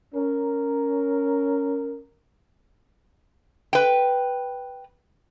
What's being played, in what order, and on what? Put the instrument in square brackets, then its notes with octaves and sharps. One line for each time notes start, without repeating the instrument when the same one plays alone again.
[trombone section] C#4 A#4
[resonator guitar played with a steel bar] B4 G5